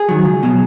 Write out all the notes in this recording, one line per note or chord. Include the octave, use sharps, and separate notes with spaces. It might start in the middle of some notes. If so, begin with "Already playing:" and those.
Already playing: G#4
D#3 F#3
C#2
B2 F#3